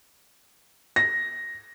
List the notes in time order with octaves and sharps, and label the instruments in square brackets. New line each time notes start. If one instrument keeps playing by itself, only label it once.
[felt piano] A#6